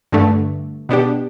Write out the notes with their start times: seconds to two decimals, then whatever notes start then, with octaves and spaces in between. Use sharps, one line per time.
0.12 G2 D3 A3
0.89 B2 B3 D4 G4